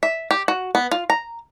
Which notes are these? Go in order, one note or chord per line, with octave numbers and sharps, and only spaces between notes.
E5
G4
F#4
B3
F4
A#5